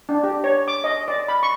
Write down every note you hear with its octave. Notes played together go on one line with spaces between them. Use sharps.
D4
G4
C#5
D6
D#5
D5
B5
C#6